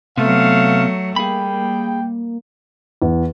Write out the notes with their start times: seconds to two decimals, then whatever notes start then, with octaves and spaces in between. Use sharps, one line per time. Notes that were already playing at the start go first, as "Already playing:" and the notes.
0.17 C3 F#3 A3 B3 F5
1.16 G3 A#3 G#4 G5 B5
3.02 E2